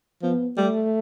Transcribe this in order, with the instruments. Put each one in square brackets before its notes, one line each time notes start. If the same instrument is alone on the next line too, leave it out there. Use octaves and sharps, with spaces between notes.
[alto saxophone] F3 [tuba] B3
[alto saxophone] G3 [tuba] A3